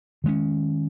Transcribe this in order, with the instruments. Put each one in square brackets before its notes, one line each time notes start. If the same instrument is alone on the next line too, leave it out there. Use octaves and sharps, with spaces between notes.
[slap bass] D#3 G#3 C#4